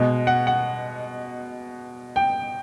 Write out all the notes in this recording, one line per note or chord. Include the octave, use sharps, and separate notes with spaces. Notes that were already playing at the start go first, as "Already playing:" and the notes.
Already playing: B2 G#3
F#5
F#5
G5